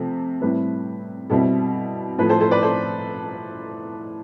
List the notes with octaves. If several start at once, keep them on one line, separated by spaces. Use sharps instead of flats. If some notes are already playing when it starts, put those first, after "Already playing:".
Already playing: C3 F3 A3
A2 G3 C4 E4 B4
B2 G3 C4 E4 A4
A2 F3 A3 B4
A4 C5
A4 C5
B4 D5
A4 C5